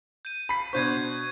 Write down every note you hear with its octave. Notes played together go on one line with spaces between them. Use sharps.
G6 D#7
B5 B6
B2 D4 C5 C#6 G6 G#6